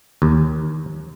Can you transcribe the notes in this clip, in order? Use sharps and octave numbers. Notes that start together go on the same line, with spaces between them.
D#2